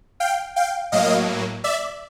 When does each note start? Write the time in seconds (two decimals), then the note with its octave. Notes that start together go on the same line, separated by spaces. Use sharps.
0.20 F5 G5
0.56 F5 G5
0.92 A2 F#3 A#3 D#5 F5
1.64 D5 E5